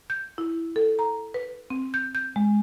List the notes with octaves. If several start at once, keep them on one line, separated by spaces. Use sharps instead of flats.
G6
E4
A4
A#5
B4
C4
G6
G6
G#3